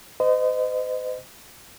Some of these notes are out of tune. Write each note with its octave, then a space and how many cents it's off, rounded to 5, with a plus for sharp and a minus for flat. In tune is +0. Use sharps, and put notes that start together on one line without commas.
C5 -40 D#5 -10